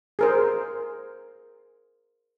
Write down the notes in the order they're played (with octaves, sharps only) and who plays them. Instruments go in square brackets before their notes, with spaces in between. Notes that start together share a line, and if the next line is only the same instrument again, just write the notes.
[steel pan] G#4 A#4 C5